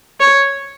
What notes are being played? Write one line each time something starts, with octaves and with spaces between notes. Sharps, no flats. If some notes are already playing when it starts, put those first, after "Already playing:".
C#5